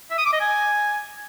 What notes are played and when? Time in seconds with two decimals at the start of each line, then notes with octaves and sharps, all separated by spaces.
0.11 E5
0.18 D#6
0.26 D6
0.33 D#5
0.41 G#5